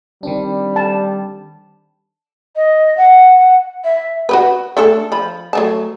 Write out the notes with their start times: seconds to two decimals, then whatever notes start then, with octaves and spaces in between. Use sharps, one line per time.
0.23 D#3 G3 C4 D4
0.76 A5
2.56 D#5
2.97 F#5
3.84 E5
4.29 F#4 G4 B4
4.77 A3 D4 A4
5.12 F3 B5
5.53 F#3 A3 A5